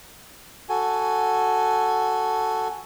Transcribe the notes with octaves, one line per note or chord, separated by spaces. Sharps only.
F#4 A4 G#5